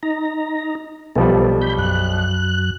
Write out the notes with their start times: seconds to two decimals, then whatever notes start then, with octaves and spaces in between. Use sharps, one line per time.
0.03 D#4 A#5
1.16 B1 F3 G3 B3 A4
1.61 B5 G6
1.78 F#2 F#6